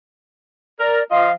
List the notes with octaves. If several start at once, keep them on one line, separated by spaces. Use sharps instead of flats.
A#4 D5
F3 F4 D#5 F5